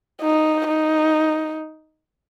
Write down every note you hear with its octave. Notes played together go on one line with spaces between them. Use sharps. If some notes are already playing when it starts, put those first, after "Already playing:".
D#4
D#4